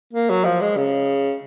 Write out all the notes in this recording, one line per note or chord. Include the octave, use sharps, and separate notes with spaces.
A#3
F#3
F3
G#3
C#3